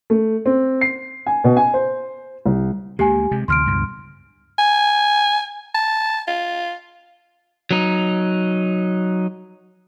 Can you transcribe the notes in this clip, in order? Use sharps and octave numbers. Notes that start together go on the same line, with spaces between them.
A3
C4
C7
G#5
B2
G#5
C5
C2
D2 G#3 A#3 G4 G#5
C3 G#3
D2 C3 E3 C6 F6 D7
C#2 G2 B2
G#5
A5
F4
F#3 D#4